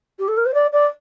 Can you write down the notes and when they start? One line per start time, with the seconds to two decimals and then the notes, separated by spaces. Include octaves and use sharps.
0.19 G4
0.28 A4
0.37 A#4
0.45 C5
0.54 D5
0.72 D5